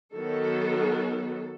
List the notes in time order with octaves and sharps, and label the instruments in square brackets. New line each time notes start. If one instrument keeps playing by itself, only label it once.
[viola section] D#3 F#3 B3 A4